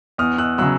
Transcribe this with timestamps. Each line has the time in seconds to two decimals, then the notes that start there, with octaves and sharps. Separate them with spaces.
0.18 E2 D#6 F6
0.38 E6 F#6
0.58 C#3 F#3 E6 F#6